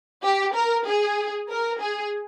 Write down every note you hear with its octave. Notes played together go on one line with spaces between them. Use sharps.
G4
A#4
G#4
A#4
G#4